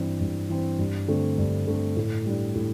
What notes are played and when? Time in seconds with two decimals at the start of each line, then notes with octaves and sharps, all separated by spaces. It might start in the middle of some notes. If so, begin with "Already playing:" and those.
Already playing: G2 E3 C4
0.21 G2
0.49 E3 C4
0.79 G2
1.08 D3 A3 C4
1.38 G2
1.67 D3 A3 C4
1.97 A2
2.26 G3 D4
2.55 A2